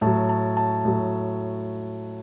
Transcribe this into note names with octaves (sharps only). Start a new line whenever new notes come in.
A2 F#3 A5
A5
A5
A2 F#3